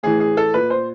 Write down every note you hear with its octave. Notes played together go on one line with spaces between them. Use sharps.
A2 E3 G#4
G#4
A4
A#2 B4
C5